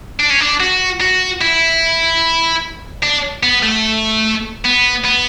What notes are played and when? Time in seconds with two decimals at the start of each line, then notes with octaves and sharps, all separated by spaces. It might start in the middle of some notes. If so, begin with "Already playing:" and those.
0.20 D4
0.30 C#4
0.41 D4
0.60 F#4
1.01 F#4
1.41 E4
3.03 D4
3.43 B3
3.63 A3
4.65 B3
5.05 B3